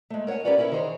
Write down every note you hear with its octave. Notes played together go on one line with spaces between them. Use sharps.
G#3 A3
A#4 C#5 D#5 F#5 G#5
C#4 G4 A#4 B4 C#5 D5
E4 A4 A#4 C#5
D#3 E3 G#4 C5 C#5